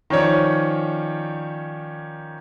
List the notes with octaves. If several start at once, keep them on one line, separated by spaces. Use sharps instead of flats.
D#3 F3 C#4 C#5 D5